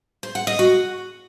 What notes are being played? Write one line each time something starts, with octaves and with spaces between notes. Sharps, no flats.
C5
F#5
D#5
F#4